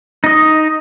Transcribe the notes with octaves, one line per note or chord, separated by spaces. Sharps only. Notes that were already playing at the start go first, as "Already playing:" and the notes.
D#4 D#5